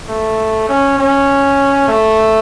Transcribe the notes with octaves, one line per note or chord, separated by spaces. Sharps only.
A3
C#4
C#4
A3